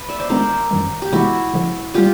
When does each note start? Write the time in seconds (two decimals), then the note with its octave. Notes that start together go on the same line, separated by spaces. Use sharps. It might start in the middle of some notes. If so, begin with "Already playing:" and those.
Already playing: B4
0.08 D5 E5
0.20 C5 D5
0.30 D#3 G#3 B3 D4 A#4 C5
0.71 F#2 D#3 G3
1.02 G4
1.12 C3 E3 G#3 B3 E4 F#4
1.53 C#3 F3 G#3
1.94 D#3 G3 F4 G4